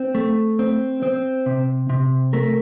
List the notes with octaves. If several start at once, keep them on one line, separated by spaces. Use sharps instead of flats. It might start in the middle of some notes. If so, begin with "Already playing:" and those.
Already playing: C4
A3
C4
C4
C3
C3
A3 A#4